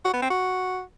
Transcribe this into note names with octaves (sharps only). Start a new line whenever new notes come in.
F#4
B3
C4
F#4